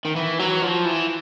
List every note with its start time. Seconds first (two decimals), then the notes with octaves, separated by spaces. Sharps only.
0.05 D#3
0.17 E3
0.39 F#3
0.62 F3
0.85 E3